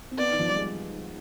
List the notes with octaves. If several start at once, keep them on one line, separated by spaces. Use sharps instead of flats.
C4
B3 D5
D#3
F3
G3
G#3